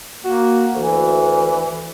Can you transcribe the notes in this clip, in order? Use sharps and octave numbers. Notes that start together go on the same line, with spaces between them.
A#3 F#4
D2 E3